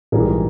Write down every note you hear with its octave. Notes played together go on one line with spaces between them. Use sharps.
A#1 G#2 E3 G3 G#4 A#4